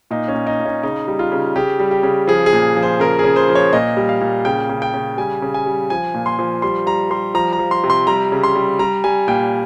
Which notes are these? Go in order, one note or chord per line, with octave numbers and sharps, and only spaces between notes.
A#2 D#4
C#4
A#2
D#4
A#2
C#4
C#3 D#4
G3
F4
C#3
C#3 G4
G3
G4
C#3
F3 G#4
G#4
A#2
F3
C5
C#3 A#4
G#4
C#3
C5
F3
C#5
A#2 D#5
G3
F5
A#2
C#3 G5
C#3
G5
C#3
G3 G#5
C#3
G#5
G3
F3 G#5
A#2
C6
F3
G3 C6
G3 A#5
G3 C6
F3 A#5
A#5
F3
C6
C3
C6
G3 A#5
C#3
C6
G3
G3 A#5
G3 G#5
A#2 G5